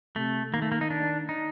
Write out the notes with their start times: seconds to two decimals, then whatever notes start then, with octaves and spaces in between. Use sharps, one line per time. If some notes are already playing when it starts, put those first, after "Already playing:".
0.15 C3 A3
0.53 D#3 A#3
0.62 A3
0.72 A#3
0.81 D#4
0.90 D4
1.29 D#4